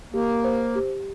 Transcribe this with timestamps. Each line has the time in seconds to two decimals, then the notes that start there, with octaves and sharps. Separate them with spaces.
0.13 A#3 G4
0.44 C5
0.75 G4